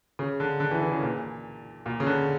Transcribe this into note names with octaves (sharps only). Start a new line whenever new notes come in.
C#3
D3
D3
E3
E3
C#3
A#2
A#2
C#3
D3